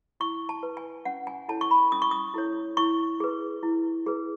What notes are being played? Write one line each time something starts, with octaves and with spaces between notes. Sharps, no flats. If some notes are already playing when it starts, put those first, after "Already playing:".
E4 C#6
A5
B4
G#5
C#4 F#5
G#5
E4 A4 C#5 A5
C#6
B5
C#4 D#6
C#6
D#6
E4 A4 C#5
E4 C#6
G#4 B4
E4
G#4 B4